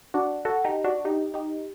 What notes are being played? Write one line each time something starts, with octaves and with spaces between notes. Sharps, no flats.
D4 F#4
F#4 A4
D#4 G4
D4 F#4
D#4 G4
D#4 G4